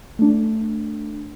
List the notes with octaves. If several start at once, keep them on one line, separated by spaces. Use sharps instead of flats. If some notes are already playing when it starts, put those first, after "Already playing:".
A3 D4